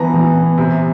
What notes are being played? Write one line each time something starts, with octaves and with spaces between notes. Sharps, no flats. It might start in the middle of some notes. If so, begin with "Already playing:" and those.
Already playing: E3 B3 A5 A#5
E3
B3
C3